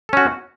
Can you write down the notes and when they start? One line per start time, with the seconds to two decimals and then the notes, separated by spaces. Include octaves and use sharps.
0.09 A4
0.13 C#4
0.17 F#4